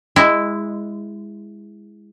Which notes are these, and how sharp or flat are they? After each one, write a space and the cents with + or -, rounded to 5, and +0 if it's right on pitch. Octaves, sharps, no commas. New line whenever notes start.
G#3 -15 E4 +0